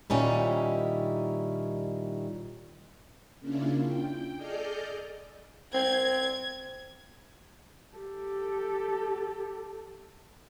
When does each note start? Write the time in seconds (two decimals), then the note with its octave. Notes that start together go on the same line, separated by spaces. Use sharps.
0.10 A#2 D#3 G3 C#4 D#4 E4
3.40 C#3 A#3 C#4 D4 E4 F4
3.86 G5
4.36 G#4 A4 D5 D#5 F6 G6
5.74 C4 G#6
7.96 G4 A4